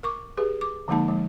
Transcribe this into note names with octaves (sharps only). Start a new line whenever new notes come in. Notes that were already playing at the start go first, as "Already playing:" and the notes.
A#4 C#6 D6
G4 G#4 B4
D6
D3 F3 G#3 A#3 D#4 A5
F3 G#3